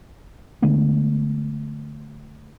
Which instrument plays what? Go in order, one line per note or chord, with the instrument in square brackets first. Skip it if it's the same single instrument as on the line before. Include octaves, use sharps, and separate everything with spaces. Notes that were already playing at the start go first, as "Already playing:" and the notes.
[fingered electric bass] D3 G#3 A3 B3